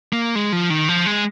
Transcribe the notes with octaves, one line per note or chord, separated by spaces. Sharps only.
A#3
G#3
F3
D#3
F3
G#3